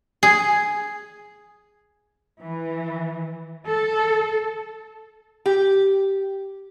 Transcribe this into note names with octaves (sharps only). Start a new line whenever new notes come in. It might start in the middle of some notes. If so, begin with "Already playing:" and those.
G#4
E3
A4
G4